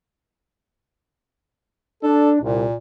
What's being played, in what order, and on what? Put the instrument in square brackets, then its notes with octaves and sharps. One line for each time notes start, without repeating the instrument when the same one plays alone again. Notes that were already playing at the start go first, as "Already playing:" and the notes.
[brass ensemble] D4 [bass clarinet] A4
[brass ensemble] C2 [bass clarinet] A#2